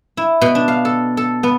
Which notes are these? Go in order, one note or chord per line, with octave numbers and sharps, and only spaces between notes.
E4
B2
D4
F5
A4
A4
B3